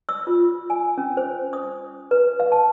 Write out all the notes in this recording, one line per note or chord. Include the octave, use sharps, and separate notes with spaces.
E6
F4
G#5
C#4
C5
D#6
B4
F5
A5